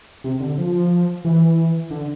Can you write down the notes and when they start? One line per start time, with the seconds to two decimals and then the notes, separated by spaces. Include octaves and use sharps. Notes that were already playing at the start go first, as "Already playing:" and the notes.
0.24 C3
0.40 D3
0.58 F3
1.25 E3
1.91 D3